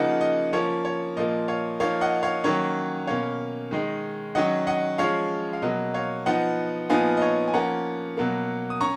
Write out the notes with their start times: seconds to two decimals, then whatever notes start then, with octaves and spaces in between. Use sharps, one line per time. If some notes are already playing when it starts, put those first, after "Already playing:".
Already playing: C#3 F3 A#3 D#4 D#5 F#5
0.21 D#5
0.53 F3 A#3 C#4 C#5
0.85 C#5
1.16 A#2 F3 A#3 D#5
1.48 C#5 F5
1.80 F3 A#3 D#4 C#5 F5
2.01 D#5 F#5
2.23 C#5 F5
2.44 D#3 F#3 A#3 C#4 C#5
3.07 B2 A#3 C#4 C#5 F5
3.71 D#3 G#3 D#4
4.35 D#3 F#3 C#4 D#5 F#5
4.67 D#5 F#5
4.98 F3 G#3 C#4 C#5 F5
5.53 F5
5.62 B2 F#3 A#3 D#5
5.94 C#5 F5
6.26 F3 B3 D#4 D#5 F#5
6.89 A#2 F3 B3 D#4 F5 G#5
7.17 D#5
7.21 C#5 F5
7.48 G#5
7.53 F3 A#3 C#4 F#5 A#5
8.17 B2 F#3 A#3
8.70 D#6
8.81 C#4 A#5 C#6